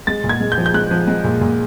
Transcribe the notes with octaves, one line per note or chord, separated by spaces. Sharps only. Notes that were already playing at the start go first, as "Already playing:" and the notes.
G#3 A6
A#2
G#6
G#3
G6
F3
G6
G#3 F#6
F3
G#3
A#2
A#2